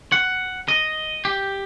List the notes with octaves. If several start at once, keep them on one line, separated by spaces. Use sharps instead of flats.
F#5
D#5
G4